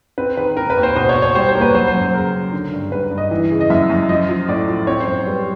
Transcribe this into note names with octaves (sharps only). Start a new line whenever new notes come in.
C4 B4
D#3 B4
C4 A#4
B4
D#2
C5
B2 C5
C#5
B2
C#5
G3 C5
C5
A#3
B4
F#3 C5
C5
F#2
C5
C#3 A#4
C#3
D3
G2
G2 B4
G2
D#5
E3
C#3
D#5
F#2 E5
F#2
F3 D#5
F3
A2 D5
F3
C4 C#5
C5
F#2
G3 B4